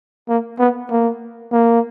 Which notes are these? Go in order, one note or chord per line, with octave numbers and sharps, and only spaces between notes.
A#3
B3
A#3
A#3